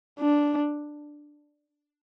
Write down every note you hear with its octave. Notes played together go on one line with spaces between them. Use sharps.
D4